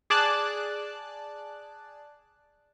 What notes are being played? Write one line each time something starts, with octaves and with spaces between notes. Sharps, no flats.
G#4 D5 A5 F#6